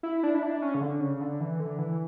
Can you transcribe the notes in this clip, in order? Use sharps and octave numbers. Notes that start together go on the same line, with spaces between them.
E4
D4
E4
D4
C#4
C#3
D3
C#3
D3
E3
D3
E3